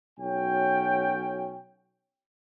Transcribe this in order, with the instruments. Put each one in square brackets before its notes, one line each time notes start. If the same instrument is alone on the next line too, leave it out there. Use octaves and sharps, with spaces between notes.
[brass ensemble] B1 F#3 C#4 G5